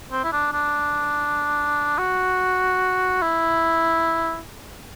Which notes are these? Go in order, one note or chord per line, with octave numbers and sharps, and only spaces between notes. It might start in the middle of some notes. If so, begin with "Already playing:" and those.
C4
E4
D4
D4
F#4
E4